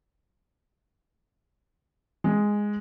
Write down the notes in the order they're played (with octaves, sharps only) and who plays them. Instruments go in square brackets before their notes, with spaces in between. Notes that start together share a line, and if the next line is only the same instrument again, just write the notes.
[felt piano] G#3